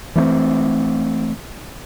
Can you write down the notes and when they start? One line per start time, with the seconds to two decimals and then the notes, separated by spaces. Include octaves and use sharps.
0.16 E3 A3 A#3 C4